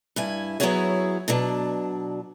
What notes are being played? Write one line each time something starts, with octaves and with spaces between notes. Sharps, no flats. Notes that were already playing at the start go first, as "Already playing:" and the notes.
G2 E4 G#5
F#3 B3 E4 F#4 G#4 C#5
B2 F#3 D4